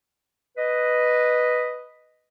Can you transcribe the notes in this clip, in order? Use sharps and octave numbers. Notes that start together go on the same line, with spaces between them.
B4 D#5